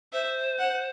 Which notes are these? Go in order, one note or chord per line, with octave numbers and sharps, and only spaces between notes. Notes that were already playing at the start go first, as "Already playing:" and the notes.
C5 E5
F#5